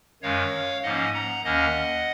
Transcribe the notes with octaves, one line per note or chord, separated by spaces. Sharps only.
F#2 D#3 G#3 C#5 F5
G#2 F3 A#3 C#4 D#5 F#5
F#5 A#5
D#2 D#3 A#3 C#4 D#5 F#5